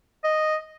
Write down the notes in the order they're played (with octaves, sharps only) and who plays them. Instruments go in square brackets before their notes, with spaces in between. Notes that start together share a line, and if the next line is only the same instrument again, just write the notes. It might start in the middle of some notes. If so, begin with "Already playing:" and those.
[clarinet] D#5